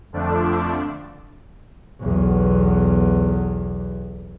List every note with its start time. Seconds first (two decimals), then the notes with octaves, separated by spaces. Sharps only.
0.13 F2 D3 F3 A3 D4
2.01 B1 E2